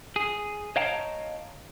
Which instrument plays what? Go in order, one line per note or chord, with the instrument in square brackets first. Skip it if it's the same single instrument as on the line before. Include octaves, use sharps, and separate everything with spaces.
[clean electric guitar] G#4
C#5 D#5 F5 G5 A5 A#5